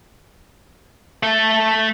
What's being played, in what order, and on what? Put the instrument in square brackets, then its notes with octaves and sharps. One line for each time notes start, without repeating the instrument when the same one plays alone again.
[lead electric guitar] A3 A4